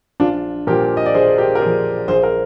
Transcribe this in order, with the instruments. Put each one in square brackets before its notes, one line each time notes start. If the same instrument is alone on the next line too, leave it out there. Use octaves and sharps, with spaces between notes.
[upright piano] A#1 D4 F4
A#2 F3 G4 A#4
D#5
D5
A#1 G#4 C5
G4 A#4
A#4
A#2 F3 G#4 C5
A#1 G#4 C5
A#4